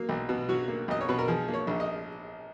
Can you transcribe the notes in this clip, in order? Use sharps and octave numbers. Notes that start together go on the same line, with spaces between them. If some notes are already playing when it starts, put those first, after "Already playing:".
Already playing: F#3 A#3
B1
B2
F#3 F#4
A#3
B1 D#5
C#5
B2 B4
A#4
F3 G#4
A#3
C#5
A#1
D#5